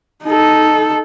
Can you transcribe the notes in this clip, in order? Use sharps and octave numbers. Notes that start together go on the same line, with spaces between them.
D#4 A4